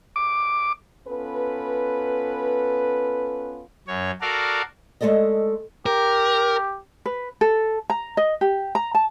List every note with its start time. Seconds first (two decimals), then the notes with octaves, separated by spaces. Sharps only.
0.16 D6
1.08 B3 C#4 F4 A4 B4
3.88 F#2 C#5
4.21 F#4 A4 A#4 D5 F5
5.01 G#3 A3 A4 D5 D#5
5.86 G4 A#4
7.06 B4
7.41 A4
7.90 A#5
8.17 D#5
8.41 G4
8.75 A#5
8.95 A5